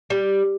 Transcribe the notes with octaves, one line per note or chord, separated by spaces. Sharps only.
G3